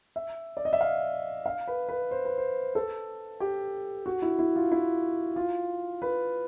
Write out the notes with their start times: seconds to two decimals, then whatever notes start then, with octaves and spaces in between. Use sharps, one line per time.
0.16 E5
0.57 D5
0.65 D#5
0.73 E5
0.81 F5
1.46 F5
1.67 B4
1.89 B4
2.11 C5
2.25 B4
2.38 C5
2.75 A4
3.40 G4
4.06 F#4
4.22 E4
4.39 E4
4.56 F4
4.72 E4
5.36 F4
6.02 B4